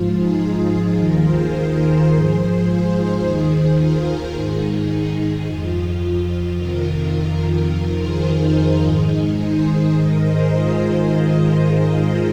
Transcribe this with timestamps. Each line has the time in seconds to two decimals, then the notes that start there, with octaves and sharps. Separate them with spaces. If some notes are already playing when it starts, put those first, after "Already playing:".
Already playing: G#2 F3 F4
0.12 D#4 G#4
0.96 D#2 D#3 F4 A#4
1.24 G#4 C5
2.09 G#2 F3
2.65 F4
2.93 D#4 G#4
3.21 D#2 D#3 G#4 C5
3.49 G#4 C5
3.77 F4 A#4
4.32 G#2 D#3 D#4 G#4
4.90 D#4 G#4
5.17 D#4 G#4
5.46 F2 F3 F4
6.57 F2 C3 D#3 F4 A#4
7.69 F2 D#3 F4 A#4
7.98 G#4 C5
8.26 D#4 G#4
8.81 G#2 D#3
9.37 G#4 C5
9.93 G#2 D#3 A#4 D#5
10.22 G#4 C5
10.50 F4 A#4